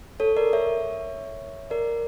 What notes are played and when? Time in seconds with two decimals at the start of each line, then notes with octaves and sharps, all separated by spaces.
0.20 A4 C#5
0.37 A#4 D5
0.53 C#5 E5
1.70 A#4 D5